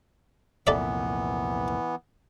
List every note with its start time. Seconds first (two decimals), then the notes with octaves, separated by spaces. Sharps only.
0.67 C2 F2 A#2 E3 B3 A4 D5 E5